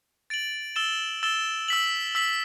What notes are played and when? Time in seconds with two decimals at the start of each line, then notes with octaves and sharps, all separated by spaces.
0.30 A6 D7 F#7
0.76 E6 A6 E7 G7
1.23 E6 A6 E7 G7
1.68 E6 B6 F#7
2.15 E6 B6 F#7